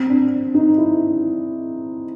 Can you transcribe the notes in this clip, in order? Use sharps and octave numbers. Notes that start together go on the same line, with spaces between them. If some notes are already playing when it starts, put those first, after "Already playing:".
Already playing: C4
D4
D#4
E4